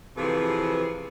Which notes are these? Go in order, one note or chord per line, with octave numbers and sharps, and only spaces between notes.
C3 E3 F3 G#4 A4 B4